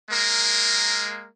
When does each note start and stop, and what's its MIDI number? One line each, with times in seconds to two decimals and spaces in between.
0.10 1.27 56
0.10 1.27 58
0.10 1.27 70